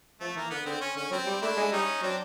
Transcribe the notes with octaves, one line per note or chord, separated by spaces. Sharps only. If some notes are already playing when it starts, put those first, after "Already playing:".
F3 A3
E3 A#3
D3 B3
D3 C4
C#4
D3 C#4
F#3 C4
G3
A3 D4 E4
G#3
G3 C#4 D#4
F#3 C4 D4